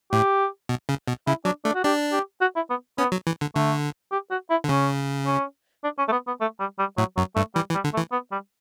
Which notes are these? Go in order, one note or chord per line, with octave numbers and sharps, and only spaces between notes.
A2 G4
B2
C#3
B2
C#3 E4
F#3 D4
A3 D4
F#4
D4 G4
G4
F#4
E4
B3
B3 C#4
F#3
E3
D3
D3 A3
G4
F#4
E4
D3
C#3 C#4
C#4
D4
C#4
A3
B3
B3
A3
G3
G3
A2 F#3
F#2 F#3
G2 A3
E3 G3
E3
G3
D3
A3
E3
B3
G3